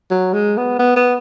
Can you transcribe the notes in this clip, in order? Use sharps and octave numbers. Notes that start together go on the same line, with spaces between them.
F#3
G#3
B3
B3
B3